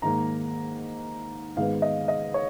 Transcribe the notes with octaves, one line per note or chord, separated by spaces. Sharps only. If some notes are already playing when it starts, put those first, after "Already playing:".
G#2 D#3 A#3 A#5
G#2 D#3 G#3 B3 F5
D#5
D#5
C#5